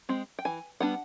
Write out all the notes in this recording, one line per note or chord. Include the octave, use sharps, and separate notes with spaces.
G#3 C4
G5
E3 G#5
G3 B3 D4 F#5